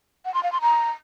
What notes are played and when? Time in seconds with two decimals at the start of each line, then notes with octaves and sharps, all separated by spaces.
0.25 F#5
0.34 C6
0.43 F5
0.52 C6
0.61 A#5